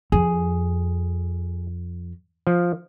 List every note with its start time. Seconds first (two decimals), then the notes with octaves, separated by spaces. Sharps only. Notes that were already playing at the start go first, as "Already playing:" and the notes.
0.12 F2 G#4
2.47 F3